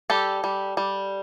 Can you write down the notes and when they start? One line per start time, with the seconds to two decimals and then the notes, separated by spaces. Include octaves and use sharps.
0.10 G3 G4 A4
0.44 G3
0.77 G3